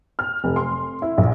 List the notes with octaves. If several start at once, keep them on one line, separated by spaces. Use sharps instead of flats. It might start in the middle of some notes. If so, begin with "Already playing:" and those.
F6
F1
C6
E4
A#1